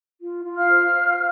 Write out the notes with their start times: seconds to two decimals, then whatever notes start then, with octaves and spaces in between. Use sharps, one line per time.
0.21 F4
0.45 F4
0.57 F5 F6
0.69 C5
0.94 C5